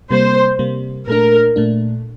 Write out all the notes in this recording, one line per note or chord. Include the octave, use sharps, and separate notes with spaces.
C3 G3 A#3 C5
C3 G3 A#3
A#2 A3 D4 A#4
A#2 A3 D4